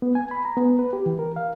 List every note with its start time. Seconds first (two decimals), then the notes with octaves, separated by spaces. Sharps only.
0.02 B3
0.15 G#5
0.31 B5
0.45 A#5
0.57 B3
0.79 B4
0.93 G4
1.06 E3
1.19 A#4
1.36 F5